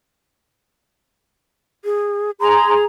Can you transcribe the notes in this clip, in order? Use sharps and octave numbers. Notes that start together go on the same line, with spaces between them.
G#4
G#4 A#5 C6